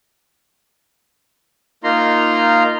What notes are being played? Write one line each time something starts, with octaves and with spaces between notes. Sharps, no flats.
A#3 D#4 F4 A#5 C6